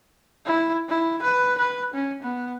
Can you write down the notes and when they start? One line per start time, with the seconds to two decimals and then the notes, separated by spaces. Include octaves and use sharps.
0.46 E4
0.89 E4
1.23 B4
1.58 B4
1.94 C#4
2.22 B3